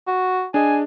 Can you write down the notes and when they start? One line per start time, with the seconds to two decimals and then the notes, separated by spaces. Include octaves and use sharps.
0.07 F#4
0.54 D4 G#4 D#5 G#5